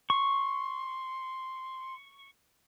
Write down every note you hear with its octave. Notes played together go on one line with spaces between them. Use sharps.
C6 C#6